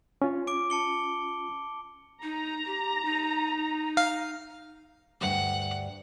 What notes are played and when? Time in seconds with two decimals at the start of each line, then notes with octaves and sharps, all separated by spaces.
0.22 C#4 F4
0.47 D6 D7
0.70 A5 C#7 G7
2.23 D#4 A#5
2.66 G4
3.05 D#4
3.97 F5
5.21 D2 G2 F#5